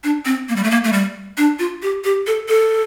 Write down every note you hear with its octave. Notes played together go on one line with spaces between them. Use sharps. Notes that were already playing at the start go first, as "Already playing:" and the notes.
D4
C4
A#3
G3
A3
A#3
A3
G3
D4
F4
G4
G4
A4
A4